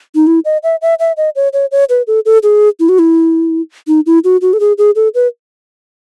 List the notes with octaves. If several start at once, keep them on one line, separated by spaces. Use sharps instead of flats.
D#4
E4
D#5
E5
E5
E5
D#5
C#5
C#5
C#5
B4
A4
A4
G#4
E4
F#4
E4
D#4
E4
F#4
F#4
A4
G#4
G#4
A4
B4